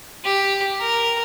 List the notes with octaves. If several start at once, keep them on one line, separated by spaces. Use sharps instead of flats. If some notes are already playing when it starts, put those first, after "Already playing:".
G4
A#4